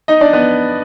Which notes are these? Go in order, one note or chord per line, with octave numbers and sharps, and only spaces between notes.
D#4 D#5
D4 D5
B3 B4